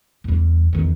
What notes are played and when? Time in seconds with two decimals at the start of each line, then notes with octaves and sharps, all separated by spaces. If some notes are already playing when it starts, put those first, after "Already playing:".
0.24 E2 G3
0.73 E2 D#3